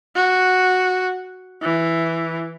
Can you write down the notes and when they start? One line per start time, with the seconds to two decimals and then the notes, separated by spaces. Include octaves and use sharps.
0.16 F#4
1.62 E3